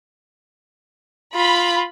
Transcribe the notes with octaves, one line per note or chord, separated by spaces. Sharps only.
F4 B5